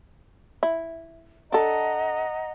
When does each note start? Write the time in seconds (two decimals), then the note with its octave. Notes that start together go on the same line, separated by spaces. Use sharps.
0.63 E4
1.52 D4 A4 D#5 F#5 A#5